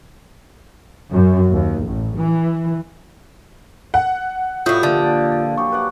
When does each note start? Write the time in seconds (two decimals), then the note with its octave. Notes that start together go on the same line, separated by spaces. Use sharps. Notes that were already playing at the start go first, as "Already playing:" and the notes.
1.11 F#2
1.52 D#2
1.85 A1
2.17 E3
3.94 F#5
4.66 A2 G3 F4 F#4 E5 D#6 G6
4.83 A#2 D3 F3 A5
5.58 F#3 G4 G#4 C#6
5.72 B4 D5 F#5